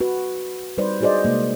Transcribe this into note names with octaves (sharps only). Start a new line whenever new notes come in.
F#4 B4
G3 D#4 B4 C5 D5
D#4 F#4 G#4 C5 D5 D#5
C3 G#3 A#3